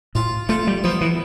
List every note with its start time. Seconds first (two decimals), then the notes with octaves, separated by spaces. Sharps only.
0.15 A2 F4
0.49 A3 F4
0.67 G3
0.84 F3 B3
1.01 E3